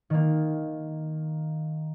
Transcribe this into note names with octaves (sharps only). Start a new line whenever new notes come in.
D#3 A#3